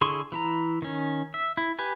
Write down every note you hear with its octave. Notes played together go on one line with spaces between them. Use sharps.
D3 E4 G#4 C6 C#6
E3 E4 A#5
D#3 C#4
E5
E4
G4 B4 G#5